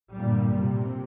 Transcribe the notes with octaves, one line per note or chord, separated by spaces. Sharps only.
G2 A#2 D3 G3
C3